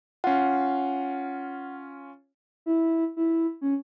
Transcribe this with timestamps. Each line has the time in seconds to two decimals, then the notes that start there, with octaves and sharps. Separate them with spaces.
0.24 C#4 F4 F#5
2.66 E4
3.17 E4
3.61 C#4